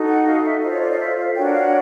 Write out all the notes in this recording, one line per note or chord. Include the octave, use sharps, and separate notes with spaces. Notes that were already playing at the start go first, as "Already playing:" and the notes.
Already playing: D#4 F#4 A4
F#5
F5
E5
F4 A4 C5 D#5
C#5
D5
D#5
E5
F5
D4 F#4 A#4 C#5 G5
F#5
F5
F#5